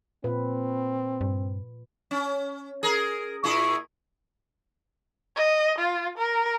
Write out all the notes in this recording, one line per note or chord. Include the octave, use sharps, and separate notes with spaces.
A#2 C4 B4
G2
C#4
G#4 A#4
A#2 E4 G#4 C#6
D#5
F4
A#4